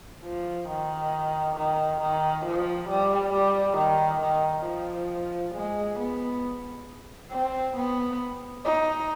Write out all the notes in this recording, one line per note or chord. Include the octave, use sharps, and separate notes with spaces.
F3
D#3
D#3
D#3
F3
G3
G3
D#3
D#3
F3
G#3
B3
C4
B3
D#4